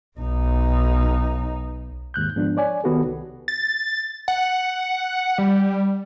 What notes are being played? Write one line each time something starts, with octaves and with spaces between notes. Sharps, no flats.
B1 D#4
D#2 G#2 F#6 G6
G#2 F3 B3 D4
C#5 D5 G#5
D#3 B3 F#4 G4 A4
C2
A6
F#5
G3